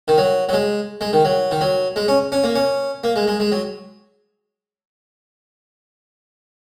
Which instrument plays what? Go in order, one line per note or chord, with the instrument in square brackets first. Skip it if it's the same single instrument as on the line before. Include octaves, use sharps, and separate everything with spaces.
[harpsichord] D#3
F#3
F#3
G#3
G#3
D#3
F#3
D#3
F#3
G#3
C#4
C#4
A#3
C#4
A#3
G#3
G#3
G#3
F#3